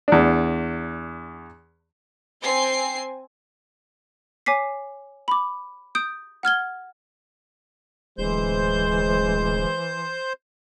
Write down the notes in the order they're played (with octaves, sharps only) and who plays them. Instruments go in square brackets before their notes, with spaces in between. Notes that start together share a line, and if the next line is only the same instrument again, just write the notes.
[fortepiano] E2 D4
[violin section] C4 G#5 C7
[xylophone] C#5 G#5 D6 B6 C7
B5 D6
D#6 G6 D7
F#5 F6 G#6 G7
[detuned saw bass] D1 [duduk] E3 [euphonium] G#3 [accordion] C5 G6